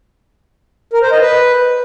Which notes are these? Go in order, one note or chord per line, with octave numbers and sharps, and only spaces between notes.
A#4
C5
D#5
B4